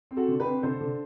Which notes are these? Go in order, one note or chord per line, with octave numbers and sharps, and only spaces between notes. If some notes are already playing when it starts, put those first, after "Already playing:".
C4
F#4 A4
D3
G4 B4
C4
D3 A4 C5
D3